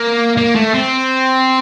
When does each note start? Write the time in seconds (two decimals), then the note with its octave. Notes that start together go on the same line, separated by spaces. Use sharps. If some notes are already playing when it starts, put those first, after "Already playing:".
Already playing: A#3
0.37 A#3
0.55 A3
0.74 C4